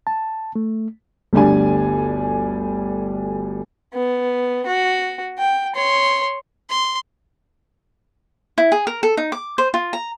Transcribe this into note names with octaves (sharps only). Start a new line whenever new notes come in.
A5
A3
G1 D2 G3 D4 G#5
B3
F#4
G5
C#5 C6
C6
E4
G#4
A#4
A4
D#4
D6
C5
F4
A#5